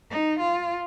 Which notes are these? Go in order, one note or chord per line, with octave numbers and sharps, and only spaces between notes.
D#4
F4